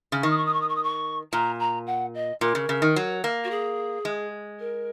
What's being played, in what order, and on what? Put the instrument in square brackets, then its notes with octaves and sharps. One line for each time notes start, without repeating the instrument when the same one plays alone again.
[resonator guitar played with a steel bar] C#3
[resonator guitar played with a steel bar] D#3 [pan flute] C#6
[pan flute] D#6
C#6
D#6
C#6
D#6
C#6
D#6
C#6
[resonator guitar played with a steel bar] A#2 [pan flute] A#5
[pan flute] A#5
F#5
D#5
[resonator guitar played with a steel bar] A#2 [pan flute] A#4
[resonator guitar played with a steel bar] C#3
C#3
D#3
F#3
A#3
[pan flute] F#4
G#4
[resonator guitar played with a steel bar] G#3
[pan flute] A#4